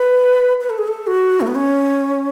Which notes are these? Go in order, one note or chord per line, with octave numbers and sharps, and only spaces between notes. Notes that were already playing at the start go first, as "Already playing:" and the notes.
Already playing: B4
B4
A4
G#4
A4
F#4
A3
B3
C#4